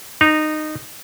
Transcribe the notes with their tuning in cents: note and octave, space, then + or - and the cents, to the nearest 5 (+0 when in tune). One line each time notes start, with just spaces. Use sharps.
D#4 -20 A#5 +0